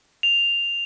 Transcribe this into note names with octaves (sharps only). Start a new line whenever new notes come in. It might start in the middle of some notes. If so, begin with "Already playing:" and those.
F7